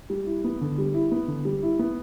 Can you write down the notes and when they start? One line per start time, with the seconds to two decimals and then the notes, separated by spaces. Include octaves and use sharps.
0.10 G3
0.26 E4
0.44 B3
0.61 D3
0.78 G3
0.94 E4
1.11 B3
1.28 D3
1.45 G3
1.63 E4
1.79 B3